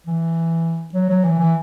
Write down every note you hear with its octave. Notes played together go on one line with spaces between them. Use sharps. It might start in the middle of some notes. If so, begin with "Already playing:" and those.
E3
F#3
F#3
E3
E3